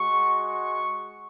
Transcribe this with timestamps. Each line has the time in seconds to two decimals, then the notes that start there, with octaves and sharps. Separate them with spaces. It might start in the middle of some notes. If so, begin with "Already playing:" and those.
Already playing: G#3 F#4 C#6
0.48 C#6